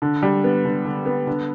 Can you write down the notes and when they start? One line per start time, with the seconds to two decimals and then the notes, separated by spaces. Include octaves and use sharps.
0.02 D3
0.22 G3
0.44 B3
0.65 D3
0.85 D3
1.06 B3
1.27 D3